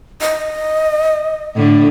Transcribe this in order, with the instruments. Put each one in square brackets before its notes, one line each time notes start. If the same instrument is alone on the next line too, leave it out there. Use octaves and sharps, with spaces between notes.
[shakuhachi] D#5
[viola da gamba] A2 D3